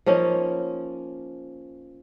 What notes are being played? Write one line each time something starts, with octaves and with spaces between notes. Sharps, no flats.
F3 A#3 C#4 D#4